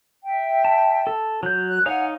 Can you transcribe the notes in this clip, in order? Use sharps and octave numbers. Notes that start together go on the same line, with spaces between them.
E5 G5
A5
A4
F#3 C#5 G6
F#6
D#4 C#5 F5 F#5 G#5